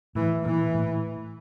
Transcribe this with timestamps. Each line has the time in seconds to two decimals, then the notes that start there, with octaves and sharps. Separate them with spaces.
0.15 A2 E3
0.45 A#2 E3
0.74 A2